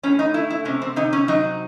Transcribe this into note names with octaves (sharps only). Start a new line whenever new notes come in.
A2 C#4
D#4
A3 E4
E4
C3 C#4
C4
C3 D#4
C#4
F#3 D#4